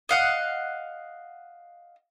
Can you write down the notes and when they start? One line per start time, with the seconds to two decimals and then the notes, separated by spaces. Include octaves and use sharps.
0.09 D#5 F5 F#5